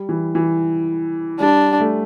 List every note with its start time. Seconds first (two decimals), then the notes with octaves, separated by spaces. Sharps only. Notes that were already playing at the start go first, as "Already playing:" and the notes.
Already playing: G3
0.09 E3
0.35 E3
1.40 G3 D4
1.80 A3